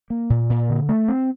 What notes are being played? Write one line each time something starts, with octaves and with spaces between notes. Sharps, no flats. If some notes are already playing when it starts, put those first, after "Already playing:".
A#3
A#2
A#2
D3
A3
C4